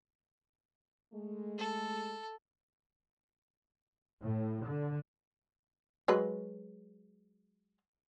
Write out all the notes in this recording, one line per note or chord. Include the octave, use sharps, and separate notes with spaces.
G#3 A3
A4
A2
D3
F#3 G#3 B4